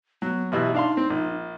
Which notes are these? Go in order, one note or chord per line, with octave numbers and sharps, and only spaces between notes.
F#3 B3
A1 B2 E4 G4
D4 D#4 F5 C6
C4
A#1